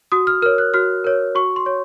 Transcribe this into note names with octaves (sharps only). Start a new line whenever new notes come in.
F#4 D#6
F6
A#4 C#5 F6
F#6
F#4 F6
A#4 C#5
F#4 C#6
C6
C#5